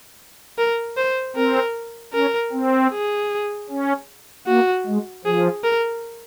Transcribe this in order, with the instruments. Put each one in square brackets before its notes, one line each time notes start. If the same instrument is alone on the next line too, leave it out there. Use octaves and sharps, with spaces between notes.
[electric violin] A#4
C5
[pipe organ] C4 [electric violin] A#4
[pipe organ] C#4 [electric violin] A#4
[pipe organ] C4
[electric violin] G#4
[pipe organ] C#4
[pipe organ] A#3 [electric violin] F#4
[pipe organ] G#3
[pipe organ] F3 [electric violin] G#4
[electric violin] A#4